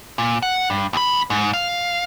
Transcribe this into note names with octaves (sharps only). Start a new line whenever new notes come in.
A#2
F#5
G2
D#2 B5
G#2
F5